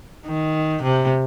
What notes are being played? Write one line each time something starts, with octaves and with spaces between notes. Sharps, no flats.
D#3
C3